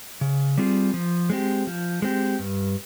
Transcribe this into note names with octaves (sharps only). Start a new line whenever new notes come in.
C#3
G3 C4 F4 G#4
F3
G#3 C4 G4
F3
G#3 C4 G4
G2